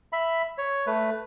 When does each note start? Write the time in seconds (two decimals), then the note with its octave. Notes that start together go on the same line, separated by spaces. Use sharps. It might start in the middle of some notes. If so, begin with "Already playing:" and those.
0.13 E5 B5
0.58 C#5
0.87 A3 B4